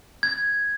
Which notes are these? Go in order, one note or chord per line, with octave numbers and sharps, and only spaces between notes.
G#6